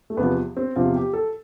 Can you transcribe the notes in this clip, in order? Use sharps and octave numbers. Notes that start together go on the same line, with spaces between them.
A3
E2 C3 F3 B3
C4
E2 C3 F3 F4
G4
A4